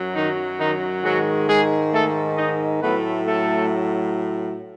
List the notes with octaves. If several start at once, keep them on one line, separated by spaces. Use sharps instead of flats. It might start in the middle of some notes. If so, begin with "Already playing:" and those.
Already playing: F#2 F#3
D#3 D#4
D#3 D#4
G#2 D#3 F#3 G#3 F#4
G#3 G#4
A3 A4
D#4 D#5
A2 F#3 A3 B3 B4
A3 A4